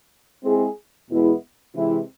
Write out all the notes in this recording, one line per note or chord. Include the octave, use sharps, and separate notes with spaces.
G#3 C4 E4 G#4
E2 B2 G#3 B3 E4
C3 E3 G#3 C4 E4